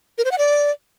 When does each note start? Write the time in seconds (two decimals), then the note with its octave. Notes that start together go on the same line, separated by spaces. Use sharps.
0.18 A#4
0.25 C5
0.31 F#5
0.38 D5